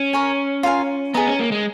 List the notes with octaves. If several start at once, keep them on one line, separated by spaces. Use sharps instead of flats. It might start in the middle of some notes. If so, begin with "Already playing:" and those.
Already playing: C#4
A#4 C#5 G#5
F4 A#4 F5 G#5
B3 G#4 D#5 A#5
C#4
A#3
G#3